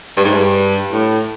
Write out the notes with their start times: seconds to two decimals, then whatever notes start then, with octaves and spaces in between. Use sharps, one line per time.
0.17 G2
0.25 G#2
0.34 G2
0.92 A2